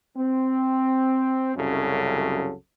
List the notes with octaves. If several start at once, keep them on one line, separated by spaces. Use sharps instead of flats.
C4
C2 F#2 C#3 F#3 A4